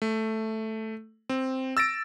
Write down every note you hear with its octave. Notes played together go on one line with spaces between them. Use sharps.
A3
C4
E6 A6 A#6 D7